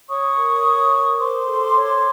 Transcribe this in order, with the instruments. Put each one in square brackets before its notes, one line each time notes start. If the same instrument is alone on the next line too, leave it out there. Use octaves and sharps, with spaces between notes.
[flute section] C#5 C#6 D#6
A#4
C#5
A#4
C5 C6 D6
A4
C#5